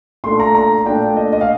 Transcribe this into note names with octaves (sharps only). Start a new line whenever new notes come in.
A#2 A3 D4 C6
A#5
A#5
A#2 A3 D4 G5
D#5
D#5
F5